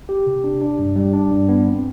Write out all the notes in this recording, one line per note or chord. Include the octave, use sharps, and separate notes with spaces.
G4
C3
D4
D4
G2
G3
D4
G2
B3
C4